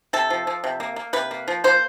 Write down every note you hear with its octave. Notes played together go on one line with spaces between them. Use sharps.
C3 A4
F3
F3
C3
A#3
A#3
C3 B4
A#3
F3
A#3 C5